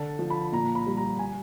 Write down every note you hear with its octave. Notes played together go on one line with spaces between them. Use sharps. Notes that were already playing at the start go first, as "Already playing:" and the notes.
Already playing: D3 A5
F3
B5
A#2 A#5
B5
G3
A#5
G#5